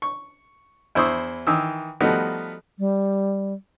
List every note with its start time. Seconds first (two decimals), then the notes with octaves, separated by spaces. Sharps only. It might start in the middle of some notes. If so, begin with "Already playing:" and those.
0.02 C#6
0.95 E2 E4 C5 C#6 D#6 E6
1.47 D#3 E3 D#6 E6
2.00 F3 G3 A3 B3 D#4 F#4
2.79 G3